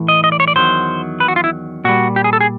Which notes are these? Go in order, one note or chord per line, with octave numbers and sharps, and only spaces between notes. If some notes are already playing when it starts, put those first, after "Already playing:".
Already playing: A2 E3
D#5
D#5
D5
C#5
D5
E2 C3 D#3 F#3 C5
B4
F#4
F4
E4
A#2 G3 F#4
G4
G#4
A4
G#4